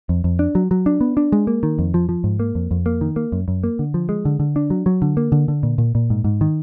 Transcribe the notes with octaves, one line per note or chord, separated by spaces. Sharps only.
F2
F2
D4
F#3
F#3
D4
B3
D4
G#3
A#3
D#3
F2
F3
F3
G#2
A#3
F2
F2
A#3
D#3
A#3
F#2
F#2
A#3
D3
F3
G#3
D3
D3
D4
F#3
F#3
D3
A#3
D3
D3
A#2
A#2
A#2
G#2
G#2
D#3